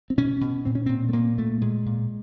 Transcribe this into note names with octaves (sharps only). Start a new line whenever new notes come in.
C4
B2 C#4
B2
A#2 C4
C#4
A#2 C4
A3
A#2 A#3
A#2 A3
A#2 G#3
A#2